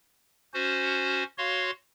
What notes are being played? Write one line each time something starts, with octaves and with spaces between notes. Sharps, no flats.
C#4 F#4 C5
F#4 C#5 F5 C6